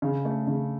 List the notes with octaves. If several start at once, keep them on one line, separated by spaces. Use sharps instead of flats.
C#3
A3
C#3